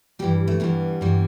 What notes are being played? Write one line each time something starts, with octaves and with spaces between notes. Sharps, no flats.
G2 E3 G3 G4
A3
G2 E3 G3 B3
G2 E3 G3